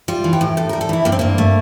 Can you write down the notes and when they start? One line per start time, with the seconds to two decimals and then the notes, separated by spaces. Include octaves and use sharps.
0.08 G3 F4
0.24 E3
0.33 G4
0.41 A2
0.57 A2 A4
0.69 G3 A#4
0.81 A4
0.89 E3 E4
1.05 G2 A#3
1.12 C4
1.19 G2 A#3
1.38 A3